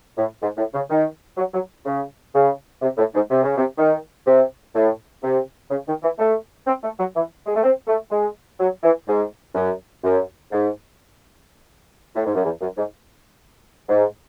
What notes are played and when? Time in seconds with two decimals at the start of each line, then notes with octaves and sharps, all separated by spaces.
0.17 A2
0.42 G#2
0.57 A2
0.74 C#3
0.90 D#3
1.37 F#3
1.54 F#3
1.86 C#3
2.34 C#3
2.82 C3
2.98 A2
3.15 G#2
3.30 C3
3.44 C#3
3.57 C3
3.78 D#3
4.27 C3
4.74 A2
5.23 C3
5.71 C#3
5.87 D#3
6.03 E3
6.19 A3
6.67 C4
6.83 A3
6.99 F#3
7.15 E3
7.47 G#3
7.56 A3
7.63 C4
7.87 A3
8.11 G#3
8.60 F#3
8.83 E3
9.08 G#2
9.55 F#2
10.03 F#2
10.52 G#2
12.15 A2
12.26 G#2
12.35 F#2
12.44 E2
12.61 F#2
12.77 G#2
13.89 G#2